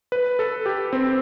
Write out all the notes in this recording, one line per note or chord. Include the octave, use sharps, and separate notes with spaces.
B4
A4
G4
C4